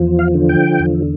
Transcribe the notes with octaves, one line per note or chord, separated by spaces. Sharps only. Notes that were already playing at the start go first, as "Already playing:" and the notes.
Already playing: E2 F3
F5
D3
G5
E2